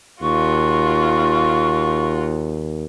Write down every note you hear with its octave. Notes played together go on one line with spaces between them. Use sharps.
D#2 F4 F#4 C#6